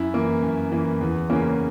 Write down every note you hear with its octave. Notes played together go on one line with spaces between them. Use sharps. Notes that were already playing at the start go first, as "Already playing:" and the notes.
Already playing: F#2 E4
E3 A#3
F#2
E3 A#3
E2
C#3 E3 A#3 C#4